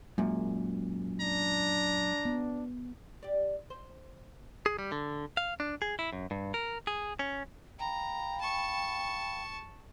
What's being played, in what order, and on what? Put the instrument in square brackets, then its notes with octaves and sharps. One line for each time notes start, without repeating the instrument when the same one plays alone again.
[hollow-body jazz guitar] F#2 A#2 [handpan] G#3
[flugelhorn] D4 [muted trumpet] A#5
[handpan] B3
[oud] G4 D5
C5
[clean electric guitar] G#4
G3
D3
F5
D4
G#4
E4
F#2
G2
A#4
G#4
C#4
[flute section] F5 G5 B5 [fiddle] A#5
[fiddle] A5 C#6